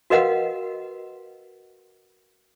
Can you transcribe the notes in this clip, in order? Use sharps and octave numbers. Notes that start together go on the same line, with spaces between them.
F#4 A#4 B4 D#5 F5 F#5